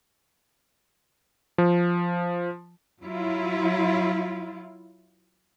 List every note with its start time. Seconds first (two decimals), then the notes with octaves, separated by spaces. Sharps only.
1.58 F3
3.03 F#3 E4 F4